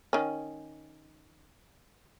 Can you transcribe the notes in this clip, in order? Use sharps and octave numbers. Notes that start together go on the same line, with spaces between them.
D#3 C#4